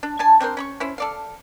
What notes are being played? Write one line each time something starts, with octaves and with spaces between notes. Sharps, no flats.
D4
D4 G#5 A5
C4 D4 A#4 C5
C#4 B5 C#6
C#4 E4 C5
A4 D5 F5